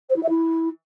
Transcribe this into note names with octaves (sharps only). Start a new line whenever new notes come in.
C5
E4
E5
E4